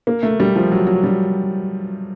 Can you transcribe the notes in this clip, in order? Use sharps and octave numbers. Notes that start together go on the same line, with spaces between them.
A#3
A3
G3
F3
F#3
F#3
G3